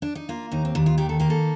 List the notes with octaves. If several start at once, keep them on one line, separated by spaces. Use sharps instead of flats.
D4
D#4
A#3 F4
D#2 D#4
C4
D#2 D4
F4
D#3 G4
A4
A#3 G4
A4